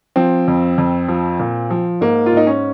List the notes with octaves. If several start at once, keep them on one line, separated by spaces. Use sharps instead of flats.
F3 C4
F2
F2
F3
A#2
F3
G#2 A#3
F4
G#2 D#4
C#4